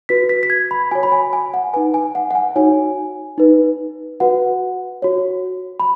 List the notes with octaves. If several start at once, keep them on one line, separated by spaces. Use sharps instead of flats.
F#4 B4 B6
B6
B6
G#6
B5
F#4 C#5 G#5
B5
G#5
G#5
F#5
D#4 B4 G#5
G#5
F#5
F#5
G#5
D#4 F#4 C#5 G#5
D#4 B4
F#4 B4 F#5
F#4 C#5
B5